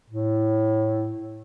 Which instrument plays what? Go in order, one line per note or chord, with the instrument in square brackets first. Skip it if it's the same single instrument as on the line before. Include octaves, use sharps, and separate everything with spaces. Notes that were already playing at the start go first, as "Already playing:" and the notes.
[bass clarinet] A2